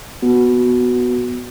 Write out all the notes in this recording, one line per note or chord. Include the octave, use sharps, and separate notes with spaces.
B3 F#4